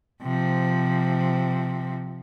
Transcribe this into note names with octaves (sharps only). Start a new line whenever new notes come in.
C3 F3